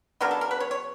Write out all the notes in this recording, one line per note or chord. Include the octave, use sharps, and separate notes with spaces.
C#3 F#3 B3 D4 A#4
A4
A#4
B4
C#5
C#5